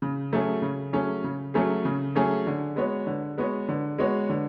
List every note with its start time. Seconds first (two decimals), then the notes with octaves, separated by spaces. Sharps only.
0.02 C#3
0.32 F#3 A3 C#4 G#4
0.62 C#3
0.93 F#3 A3 C#4 G#4
1.24 C#3
1.54 F#3 A3 C#4 G#4
1.85 C#3
2.15 F#3 A3 C#4 G#4
2.47 D3
2.76 G#3 B3 F#4 C#5
3.07 D3
3.38 G#3 B3 F#4 C#5
3.69 D3
3.98 G#3 B3 F#4 C#5
4.29 D3